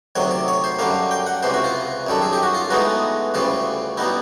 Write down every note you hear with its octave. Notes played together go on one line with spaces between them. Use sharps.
D2 C3 D#3 F#3 C#5
D5
C#5
C5
F#2 D3 G3 A#3 F5
G5
F#5
C#2 C3 E3 C5
F#4
F4
F#2 D#3 G3 A4
G#4
G4
F#4
F4
A2 E3 G#3 B3 D#4 F#4
D2 C#3 E3 G3 F4
B2 G3 B3 D#4 E4